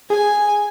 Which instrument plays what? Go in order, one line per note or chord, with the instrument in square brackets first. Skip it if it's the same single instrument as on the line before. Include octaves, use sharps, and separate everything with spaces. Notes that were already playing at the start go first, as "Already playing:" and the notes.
[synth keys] G#4 [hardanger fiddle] G#5